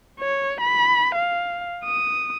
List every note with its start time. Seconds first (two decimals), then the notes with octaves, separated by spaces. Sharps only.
0.21 C#5
0.61 B5
1.15 F5
1.84 D#6